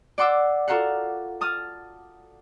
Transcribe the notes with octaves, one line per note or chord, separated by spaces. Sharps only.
D5 F#5 C6 D6 E6
F4 F#4 A4 A#4 F5 F#5
A5 D#6 F6